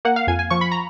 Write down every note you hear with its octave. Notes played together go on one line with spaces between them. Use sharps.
A#3 F#5
F5
F2 G#5
G#5
F3 C#6
B5
A#5